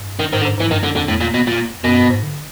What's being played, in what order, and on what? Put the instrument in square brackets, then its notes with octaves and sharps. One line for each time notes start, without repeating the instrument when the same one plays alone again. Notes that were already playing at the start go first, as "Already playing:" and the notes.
Already playing: [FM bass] G2
[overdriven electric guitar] D#3
[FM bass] G#2 [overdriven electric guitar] D#3
[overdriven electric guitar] D3
[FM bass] G#2
[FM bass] G#2 [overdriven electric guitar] E3
[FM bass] G2 [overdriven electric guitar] D#3
[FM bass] F#2 [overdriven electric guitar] D3
[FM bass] F2 [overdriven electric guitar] D3
[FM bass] E2 [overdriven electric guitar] A2
[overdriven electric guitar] A#2
[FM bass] F2
[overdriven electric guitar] B2
A#2
[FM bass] F#2 [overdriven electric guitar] B2
[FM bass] G2
G#2
D3